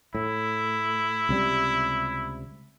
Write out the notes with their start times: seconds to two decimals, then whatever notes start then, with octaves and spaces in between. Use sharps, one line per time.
0.15 A2 E4
1.29 C#2 C3 G3